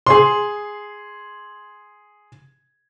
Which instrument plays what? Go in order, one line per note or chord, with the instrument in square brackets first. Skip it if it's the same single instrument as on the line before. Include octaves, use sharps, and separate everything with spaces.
[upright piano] G#4 C6